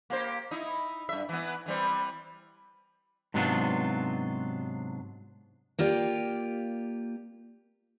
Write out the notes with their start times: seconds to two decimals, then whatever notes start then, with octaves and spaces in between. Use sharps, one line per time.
0.10 A#3 G4 C5
0.51 D#4 E4
1.09 G2 E5
1.29 E3 B3
1.66 E3 G3 C4
3.34 G#2 C3 F#3 B3 D4 F4
5.79 A#3 F4 G4 D5